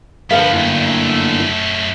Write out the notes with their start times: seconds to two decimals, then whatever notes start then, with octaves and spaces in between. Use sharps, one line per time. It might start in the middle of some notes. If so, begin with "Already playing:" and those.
0.31 G2 D3 F3 B3 A#4 B4 F5
0.53 F#2 A3 A#3 E4